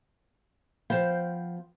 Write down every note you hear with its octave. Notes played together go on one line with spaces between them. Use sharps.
F3 B3 C5 F5 G5